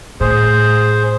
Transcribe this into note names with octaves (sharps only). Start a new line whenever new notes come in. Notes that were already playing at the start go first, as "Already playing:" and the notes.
A2 G#4 C5